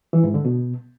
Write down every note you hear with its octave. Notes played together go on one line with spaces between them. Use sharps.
E3
G#2
D3
B2